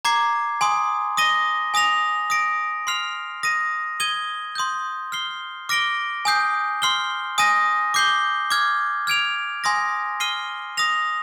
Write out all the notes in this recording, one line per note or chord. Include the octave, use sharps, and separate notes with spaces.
A#5 D6 G#6 C7
G#5 C6 D#6
D#6 A#6 D#7 G7
G#5 D#6 A#6 F7
D#6 A#6 D7
C6 F6 C7 F7
D#6 A#6 D#7
D#6 G#6 D#7 G7
C6 D#6 G6
F6 C7 G7
D6 F6 A#6 D7 G7
G#5 D#6 G6 C7
C6 F6 C7 G7
G#5 D#6 A#6 D#7
D6 G6 C7 G7
D6 F6 G#6
F6 G#6 D7 F7
G#5 C6 D#6 A#6
F6 C7 D#7 G7
D#6 A#6 F7